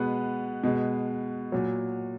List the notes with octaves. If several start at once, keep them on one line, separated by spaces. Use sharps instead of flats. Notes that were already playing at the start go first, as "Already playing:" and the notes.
Already playing: B2 G#3 B3 B4
B2 G#3
A#2 F#3